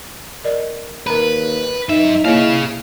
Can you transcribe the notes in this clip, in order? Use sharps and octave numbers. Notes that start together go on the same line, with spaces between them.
A#4 D5 D#5
D#2 A#4 B4 A#5
F#2 D#4 E5
A#3 E4 G#4 C#5 D#5 F5